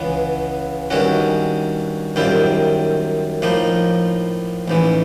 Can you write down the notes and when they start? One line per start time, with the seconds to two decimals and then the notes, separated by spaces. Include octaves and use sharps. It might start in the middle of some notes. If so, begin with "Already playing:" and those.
Already playing: C#2 C#3 E3 G#3 B3
0.90 G2 D#3 G#3 C#4 F#4
2.16 F#2 D#3 G3 C4 F4
3.42 A2 F3 A#3 D#4
4.68 A1 G#2 E3